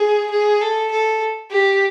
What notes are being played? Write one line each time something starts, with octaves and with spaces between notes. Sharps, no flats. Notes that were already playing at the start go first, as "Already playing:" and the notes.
Already playing: G#4
G#4
A4
A4
G4